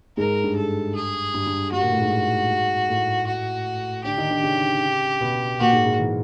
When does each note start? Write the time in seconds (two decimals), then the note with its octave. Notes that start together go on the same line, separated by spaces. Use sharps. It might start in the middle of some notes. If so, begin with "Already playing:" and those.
0.17 G#2 G#3 A#4
0.43 G2 G3
0.56 A4
0.95 G#4
1.34 G2 G3
1.46 G2 G3
1.72 G2 G3 F#4
1.82 A#2 A#3
1.92 A2 A3
2.01 G#2 G#3
2.89 A2 A3
3.27 F#4
4.04 D3 D4 G4
4.18 D#3 D#4
4.31 D3 D4
4.43 C#3 C#4
5.21 B2 B3
5.60 A#2 A#3 F#4
5.73 G#2 G#3
5.85 G#2 G#3
5.99 E3